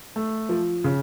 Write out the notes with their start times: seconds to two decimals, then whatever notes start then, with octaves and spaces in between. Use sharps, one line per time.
0.16 A3
0.49 F3
0.84 C#3